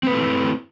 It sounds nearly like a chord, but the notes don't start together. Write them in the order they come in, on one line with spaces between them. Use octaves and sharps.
C4 B4 A3 F4 E4